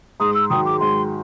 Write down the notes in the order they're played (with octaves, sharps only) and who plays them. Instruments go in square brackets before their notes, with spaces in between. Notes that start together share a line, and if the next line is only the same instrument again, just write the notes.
[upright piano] G#2 [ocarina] D#6
[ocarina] E6
[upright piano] D#3 F#3 [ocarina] D#6
[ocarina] D6
[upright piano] G#2 [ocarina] C6